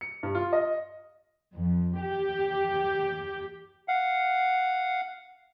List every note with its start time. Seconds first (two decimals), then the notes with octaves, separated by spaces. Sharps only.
0.01 C#7
0.23 G2
0.35 F4
0.53 D#5
1.53 F2
1.99 G4
3.88 F5 F#5